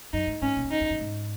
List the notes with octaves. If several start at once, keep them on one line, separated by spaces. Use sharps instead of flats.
F#2 D#4
G#2
G#2 C#4
A#2
E2
F#2 D#4
E2
F#2
G#2